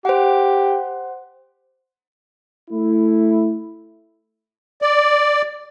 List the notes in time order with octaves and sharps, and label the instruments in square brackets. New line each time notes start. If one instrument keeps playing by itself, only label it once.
[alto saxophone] G4 [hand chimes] C5 F#5
[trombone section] A3 E4
[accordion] D5